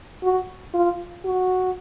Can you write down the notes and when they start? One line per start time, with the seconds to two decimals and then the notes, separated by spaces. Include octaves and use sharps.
0.23 F#4
0.74 F4
1.25 F#4